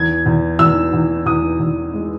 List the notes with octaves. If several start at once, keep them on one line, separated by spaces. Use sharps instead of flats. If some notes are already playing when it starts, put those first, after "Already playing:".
Already playing: E2 G#6
E2
E2 E6
E2
E2 D#6
E2
G#3